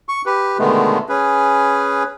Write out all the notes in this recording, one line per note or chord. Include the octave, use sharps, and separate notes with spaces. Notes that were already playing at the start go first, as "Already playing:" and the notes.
C#6
G4 B4
B2 D3 D#3 G#3 A3 B3
C#4 G#4 B4